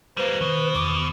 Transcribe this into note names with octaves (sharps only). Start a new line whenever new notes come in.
G3 A#3 B4 C5
B2 D#3 E3
E2 D#3 D6